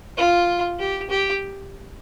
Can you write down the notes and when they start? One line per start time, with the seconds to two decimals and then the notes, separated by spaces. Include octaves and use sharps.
0.17 F4
0.79 G4
1.10 G4